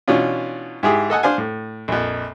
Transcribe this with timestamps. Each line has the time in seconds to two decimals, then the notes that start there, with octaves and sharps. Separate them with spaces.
0.08 B2 E3 C#4 D4 F4
0.83 G#2 E4 G4 G#4
1.10 A4 D#5 F#5 G#5
1.23 D4 C5 F5 G#5
1.38 A2
1.88 A#1 F2